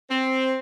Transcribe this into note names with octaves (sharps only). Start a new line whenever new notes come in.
C4